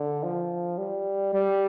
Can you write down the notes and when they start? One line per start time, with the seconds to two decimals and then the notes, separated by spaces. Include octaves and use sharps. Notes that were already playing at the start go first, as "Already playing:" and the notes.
Already playing: D3
0.23 F3
0.78 G3
1.34 G3